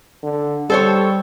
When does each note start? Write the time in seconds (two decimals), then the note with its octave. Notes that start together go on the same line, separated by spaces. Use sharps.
0.23 D3
0.70 G3 A4 C5 C#5